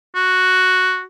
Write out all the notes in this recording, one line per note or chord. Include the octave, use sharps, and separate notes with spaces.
F#4